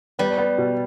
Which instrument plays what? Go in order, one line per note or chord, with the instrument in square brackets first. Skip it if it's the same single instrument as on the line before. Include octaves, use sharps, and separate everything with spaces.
[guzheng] G3 [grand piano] B3
[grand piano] B3
B2